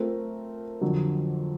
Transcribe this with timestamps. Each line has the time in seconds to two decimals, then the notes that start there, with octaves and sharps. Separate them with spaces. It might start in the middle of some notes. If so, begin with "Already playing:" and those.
Already playing: A3 C4 F4 A#4
0.81 F2 D3 F#3